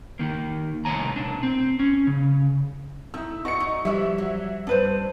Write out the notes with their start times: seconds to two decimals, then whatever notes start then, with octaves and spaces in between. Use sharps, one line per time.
0.19 D#3 A#3
0.85 C2 A3 A#3 C#5 G#5 A#5
1.16 B2 D4
1.43 C4
1.79 C#4
2.07 C#3
3.14 A3 D#4 E4 E6
3.45 F#4 D5 D#5 C#6 C#7
3.60 D#4
3.85 E3 F3 G3 E4 E5 E6
4.18 F#3
4.67 G2 D4 B4 C5